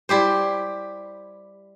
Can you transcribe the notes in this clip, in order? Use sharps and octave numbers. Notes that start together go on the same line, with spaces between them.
G3 E4 G4 C5